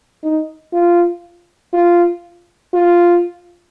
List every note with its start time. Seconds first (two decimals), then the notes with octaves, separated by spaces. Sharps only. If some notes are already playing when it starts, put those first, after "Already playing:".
0.23 D#4
0.73 F4
1.73 F4
2.73 F4